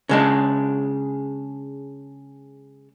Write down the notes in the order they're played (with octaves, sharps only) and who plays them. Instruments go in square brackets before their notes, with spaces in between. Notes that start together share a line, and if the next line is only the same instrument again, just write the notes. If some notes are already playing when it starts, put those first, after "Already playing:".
[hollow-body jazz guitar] C#3 G#3 D4